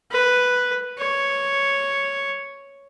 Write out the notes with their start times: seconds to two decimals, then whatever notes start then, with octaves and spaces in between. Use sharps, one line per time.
0.11 B4
0.98 C#5